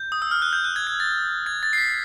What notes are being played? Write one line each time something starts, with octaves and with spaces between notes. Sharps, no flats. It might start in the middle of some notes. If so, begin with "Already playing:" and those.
Already playing: G6
D#6
E6
F6
F#6
G6
F#6
G#6
G#6
A6
G#6
A6
C7
B6